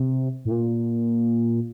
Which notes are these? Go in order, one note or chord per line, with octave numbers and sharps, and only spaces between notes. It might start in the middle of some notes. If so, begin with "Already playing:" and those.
Already playing: C3
A2
A#2